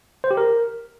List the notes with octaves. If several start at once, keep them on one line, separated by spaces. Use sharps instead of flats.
C5
G4
A#4